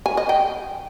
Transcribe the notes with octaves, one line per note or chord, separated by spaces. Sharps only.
G#5
D#5
G5